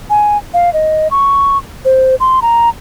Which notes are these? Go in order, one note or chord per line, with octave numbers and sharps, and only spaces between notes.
G#5
F5
D#5
C#6
C5
C6
A#5